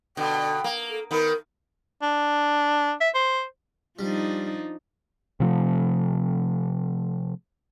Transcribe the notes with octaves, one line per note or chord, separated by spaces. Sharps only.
B2 D3 G5
A#3
A4
D#3 B3 A#4
D4
E5
C5
F3 G3 D4 D#4
C3 F3 A3